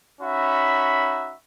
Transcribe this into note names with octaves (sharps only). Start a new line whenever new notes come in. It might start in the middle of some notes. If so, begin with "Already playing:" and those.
C#4 D#4 F#4 E5 B5